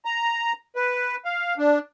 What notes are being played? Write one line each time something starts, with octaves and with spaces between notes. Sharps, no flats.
A#5
B4
F5
D4